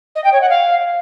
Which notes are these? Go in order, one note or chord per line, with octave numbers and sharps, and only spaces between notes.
D#5
G5
C#5
F#5
F5